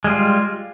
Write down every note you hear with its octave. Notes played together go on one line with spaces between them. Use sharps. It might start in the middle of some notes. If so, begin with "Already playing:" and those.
G3 G#3 F4